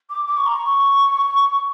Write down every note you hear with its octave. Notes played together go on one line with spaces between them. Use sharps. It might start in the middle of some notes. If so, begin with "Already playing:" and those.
D6
D6
C#6
A#5
C#6